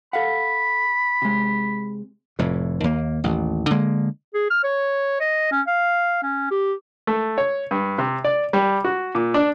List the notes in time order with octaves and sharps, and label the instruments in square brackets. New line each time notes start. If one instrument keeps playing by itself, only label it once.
[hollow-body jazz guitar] A4 F5 F#5 [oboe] B5
[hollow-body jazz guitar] C3 G#3
[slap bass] F1 F2 A2
D#2 A#3
A1 D#2
D3 G#3 A#3
[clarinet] G#4
F6
C#5
D#5
C#4
F5
C#4
G4
[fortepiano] A3
C#5
G2
C3
D5
G3
F#4
A#2
D4